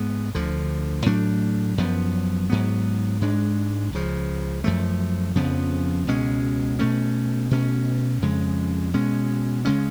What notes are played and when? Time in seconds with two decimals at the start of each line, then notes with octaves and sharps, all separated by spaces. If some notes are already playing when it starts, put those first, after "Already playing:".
Already playing: G#2 G#3 B3
0.35 D2 D3 F3
1.06 A2 F#3 A3 D4
1.78 F#2 F3 B3
2.50 G#2 F#3 B3
3.21 G#2 G#3 D4
3.93 C#2 C#3 F3
4.64 F#2 F3 A3
5.36 F2 C#3 F3 B3
6.07 C#2 B2 G#3 C#4
6.79 B2 A3 C#4
7.51 B2 A3 C#4
8.22 F2 C#3 G#3
8.94 B2 G#3 C#4
9.65 C#3 G#3 C#4